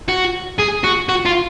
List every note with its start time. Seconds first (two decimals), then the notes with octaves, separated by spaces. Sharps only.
0.08 F#4
0.59 G#4
0.84 F#4
1.09 F#4
1.26 F4